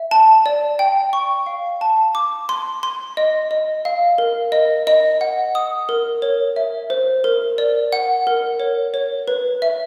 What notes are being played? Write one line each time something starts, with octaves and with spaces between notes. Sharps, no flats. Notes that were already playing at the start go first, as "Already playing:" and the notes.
Already playing: E5
A5
D5
G5
C#6
F5
A5
D6
C6
C6
D#5
D#5
F5
A#4
D#5
D#5
F#5
D#6
A#4
C#5
E5
C5
A#4
D5
F#5
A#4
C#5
C#5
B4
E5